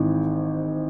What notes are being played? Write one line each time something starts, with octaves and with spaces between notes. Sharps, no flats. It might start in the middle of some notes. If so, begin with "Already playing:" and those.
Already playing: G#1 G#2 E3